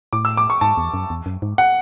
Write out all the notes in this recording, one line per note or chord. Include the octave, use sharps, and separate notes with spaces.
A2 D6
E6
D6
C#6
G#2 A5
E2
F#2
E2
F#2
G#2
F#5